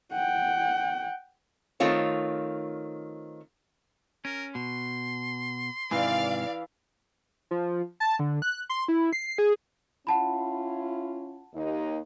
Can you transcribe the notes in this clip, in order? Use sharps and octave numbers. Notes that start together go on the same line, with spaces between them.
F#5 G5
D#3 A3 C4 F4 C#5
C#4 A#4
B2 C6
G#2 C3 D#3 E3 D5 F5
F3
A5
D3
F#6
C6
E4
C7
G#4
C#4 E4 F4 F#5 A5 B5
D#2 D#4